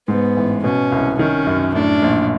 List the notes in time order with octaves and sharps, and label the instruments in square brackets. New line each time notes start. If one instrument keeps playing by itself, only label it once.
[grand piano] G#2 [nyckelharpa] B3
[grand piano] A1
[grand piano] B2 [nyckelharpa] C#4
[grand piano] C2
[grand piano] D#3 [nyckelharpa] C#4
[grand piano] F#2
[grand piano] A2 [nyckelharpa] D4
[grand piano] A#1